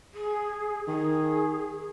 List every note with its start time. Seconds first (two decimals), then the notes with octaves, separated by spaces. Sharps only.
0.14 G#4
0.87 D#3 G#4